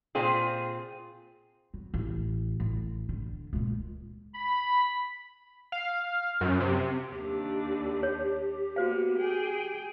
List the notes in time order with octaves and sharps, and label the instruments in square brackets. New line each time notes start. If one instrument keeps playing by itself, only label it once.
[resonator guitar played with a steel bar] A#2 C4 F4 G#4
[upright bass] F#3
A1
A1
D3
C#2 A#2
[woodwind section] B5
[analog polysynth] F5
F#2
C3
[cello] D#2 D4 [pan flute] G4
[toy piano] C#5
[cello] A#3 B3 [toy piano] F#4 C5 F5
[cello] G#4 G5